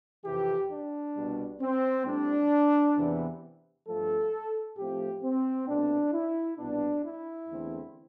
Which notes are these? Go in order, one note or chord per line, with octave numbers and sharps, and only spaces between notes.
F2 C3 E3 G4
D4
C2 B2 G3
C4
A2 G3 C4 D4
E2 C3 E3 B3
G2 F3 A3 A4
A2 F3 A3 C4 G4
C4
C2 B2 A3 C4 D4
E4
C2 B2 B3 D4
E4
E2 D3 A3 C4